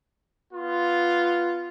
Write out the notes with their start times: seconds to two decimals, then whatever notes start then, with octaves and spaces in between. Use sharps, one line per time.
0.52 B3 F4